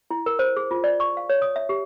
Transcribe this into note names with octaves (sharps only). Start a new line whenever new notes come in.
E4
A#4
C5
G#4
F4
D5
C#6
F5
C#5
D#6
E5
G4